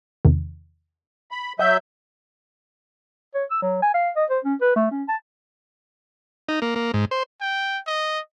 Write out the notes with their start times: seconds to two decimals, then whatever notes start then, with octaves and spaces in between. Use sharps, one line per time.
0.25 E2 C3 D#3
1.31 B5
1.59 F#3 D#5 E5 F#5 G6
3.35 C#5
3.51 E6
3.62 F#3
3.82 G#5
3.95 F5
4.16 D#5
4.30 C5
4.45 C#4
4.61 B4
4.76 A3
4.91 C#4
5.09 A5
6.49 D#4
6.62 A#3
6.76 A#3
6.94 G#2
7.11 C5
7.41 G5
7.87 D#5